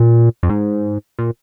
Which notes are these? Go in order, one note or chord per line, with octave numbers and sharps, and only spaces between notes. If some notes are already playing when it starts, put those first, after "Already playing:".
Already playing: A#2
F2
G#2
A#2